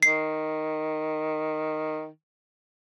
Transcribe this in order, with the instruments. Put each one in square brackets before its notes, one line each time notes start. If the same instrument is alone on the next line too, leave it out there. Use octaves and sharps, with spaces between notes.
[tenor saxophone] D#3 [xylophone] C7